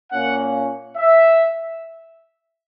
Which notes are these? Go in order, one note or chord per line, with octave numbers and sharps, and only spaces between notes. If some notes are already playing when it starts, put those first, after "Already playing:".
A#2 A#3 C#4 F#5
E5